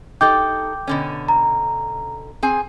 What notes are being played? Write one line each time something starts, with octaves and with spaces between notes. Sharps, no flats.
D#4 G4 A4 G5 D6 G6
B2 D3 C#4
A#5
C4 G#4 G#5